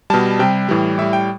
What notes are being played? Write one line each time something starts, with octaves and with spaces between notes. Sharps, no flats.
B2 G3 A5
C3 G3 G5
A2 E3 G3
A2 G3 E5
G5